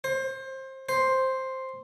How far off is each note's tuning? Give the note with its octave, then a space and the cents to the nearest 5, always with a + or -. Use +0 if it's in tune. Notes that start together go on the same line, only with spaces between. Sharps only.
C5 +25
C5 +5